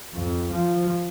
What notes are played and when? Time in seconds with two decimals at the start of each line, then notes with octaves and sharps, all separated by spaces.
0.14 F2
0.53 F3